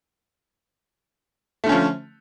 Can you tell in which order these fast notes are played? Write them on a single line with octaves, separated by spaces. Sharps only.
A3 D3 C#4 F3